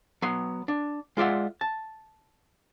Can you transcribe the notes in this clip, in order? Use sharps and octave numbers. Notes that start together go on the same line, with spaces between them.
F#3 B3 C6
D4
G#3 F4 D5 E5 F#5
A5